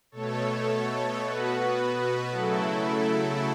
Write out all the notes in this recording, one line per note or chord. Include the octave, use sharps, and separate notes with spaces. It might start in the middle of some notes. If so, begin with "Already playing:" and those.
B2 A3 A4 C#5
B2 B3 F#4 B4
C#3 F#3 A3 E4 A4